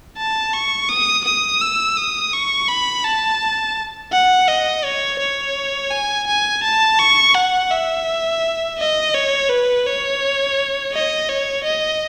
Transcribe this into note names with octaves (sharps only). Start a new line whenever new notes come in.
A5
C#6
D#6
D#6
E6
D#6
C#6
B5
A5
F#5
D#5
C#5
C#5
G#5
G#5
A5
C#6
F#5
E5
D#5
C#5
B4
C#5
D#5
C#5
D#5